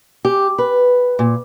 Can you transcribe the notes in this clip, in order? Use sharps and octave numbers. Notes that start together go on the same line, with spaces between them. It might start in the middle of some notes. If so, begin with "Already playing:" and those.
G4
B4
A#2